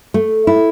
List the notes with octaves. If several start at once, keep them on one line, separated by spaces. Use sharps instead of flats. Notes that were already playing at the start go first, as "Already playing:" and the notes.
A3
E4